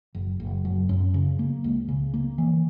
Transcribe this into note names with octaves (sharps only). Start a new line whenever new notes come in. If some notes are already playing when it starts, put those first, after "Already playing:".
F#1
F#1
F#2
F#2
C#3
A#3
C#2
C#3
A#3
E3